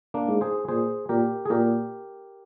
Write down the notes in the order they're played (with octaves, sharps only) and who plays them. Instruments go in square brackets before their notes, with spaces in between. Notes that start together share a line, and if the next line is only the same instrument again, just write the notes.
[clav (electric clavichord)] A#3 D4
[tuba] G#2
[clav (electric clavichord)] G#4 C5
[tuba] A#2 [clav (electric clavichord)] G#4 C5
[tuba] A#2 [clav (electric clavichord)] G4 A#4
[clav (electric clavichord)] G#4
[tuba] A#2 [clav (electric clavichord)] G4 A#4